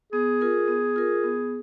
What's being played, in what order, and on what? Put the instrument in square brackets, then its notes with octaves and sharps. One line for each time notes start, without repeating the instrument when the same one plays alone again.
[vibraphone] B3 [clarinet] G#4
[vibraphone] F4 A#4
B3
F4 A#4
B3